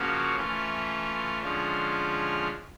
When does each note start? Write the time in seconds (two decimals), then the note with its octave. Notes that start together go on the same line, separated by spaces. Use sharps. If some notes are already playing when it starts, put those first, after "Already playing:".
Already playing: C#3 F3 A#3 C#4 F#4
0.36 E3 A3 C#4 F4
1.41 D3 F3 G#3 C#4 F4